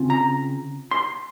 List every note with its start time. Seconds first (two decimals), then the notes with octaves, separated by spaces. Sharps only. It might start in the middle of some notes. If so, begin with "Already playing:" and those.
Already playing: C#3 C4 F4
0.10 A#5
0.91 C6